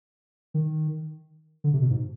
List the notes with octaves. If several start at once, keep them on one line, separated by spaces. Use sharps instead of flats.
D#3
D3
C3
B2
G#2